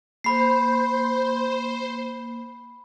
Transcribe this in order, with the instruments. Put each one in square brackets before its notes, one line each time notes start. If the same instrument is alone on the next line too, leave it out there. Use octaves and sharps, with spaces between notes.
[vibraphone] A#3 [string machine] C5 [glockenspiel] B5 C7